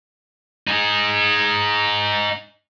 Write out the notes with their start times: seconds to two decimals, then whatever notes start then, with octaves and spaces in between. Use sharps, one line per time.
0.67 D#4 G#4